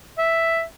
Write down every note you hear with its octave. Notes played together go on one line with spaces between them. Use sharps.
E5